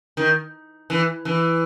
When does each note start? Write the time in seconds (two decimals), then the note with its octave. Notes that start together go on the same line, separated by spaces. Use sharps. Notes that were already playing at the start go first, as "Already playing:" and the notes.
0.17 D#3
0.90 E3
1.25 E3